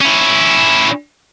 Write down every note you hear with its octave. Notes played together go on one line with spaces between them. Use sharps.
C#4 E4